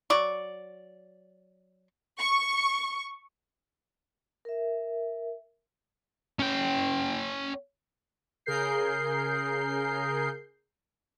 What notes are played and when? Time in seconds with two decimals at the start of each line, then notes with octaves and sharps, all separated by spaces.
0.10 F#3 D5 C#6
2.19 C#6
4.45 A#4 E5
6.39 C#4 G5
8.46 C#3 G#4 A#4 G6 C7